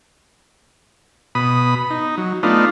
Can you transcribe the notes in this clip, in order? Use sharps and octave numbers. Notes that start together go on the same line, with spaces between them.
B2 B5 D#6
D#4
F#3
A3 B3 D4 D#4 F4